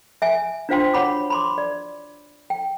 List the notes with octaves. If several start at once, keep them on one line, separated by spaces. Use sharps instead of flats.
E5 G#5
D4 F4 C5 F5 G5 C6
F#4 C#5 F#5 B5 D6
B5 C6 D6
D5
G5